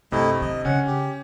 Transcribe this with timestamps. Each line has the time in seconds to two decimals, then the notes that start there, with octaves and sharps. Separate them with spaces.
0.12 G2 C3 A3 E4 D#5
0.41 D#3 D4 D#5
0.65 C#3 C#4 F#5
0.87 G4